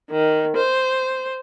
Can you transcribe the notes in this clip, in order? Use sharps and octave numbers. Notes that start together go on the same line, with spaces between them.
D#3
C5